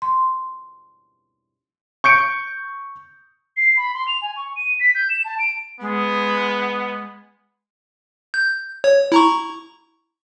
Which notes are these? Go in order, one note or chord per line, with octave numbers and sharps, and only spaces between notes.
C6
C#6 G6 C#7 D7
C7
B5
C6
F7
G#5
C#6
D#7
B6
G6
E7
A5
D7
G#3 B3
G6
C#5
E4 A#5 C#6